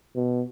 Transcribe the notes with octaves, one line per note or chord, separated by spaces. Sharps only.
B2